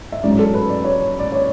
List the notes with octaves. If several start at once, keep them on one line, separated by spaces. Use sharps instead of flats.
E5
A1 G#2 F#3 C#4 D5
A4
B4
D5
C#5
D5
C#5